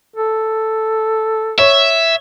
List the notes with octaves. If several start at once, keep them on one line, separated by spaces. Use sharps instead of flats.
A4
C#5 E5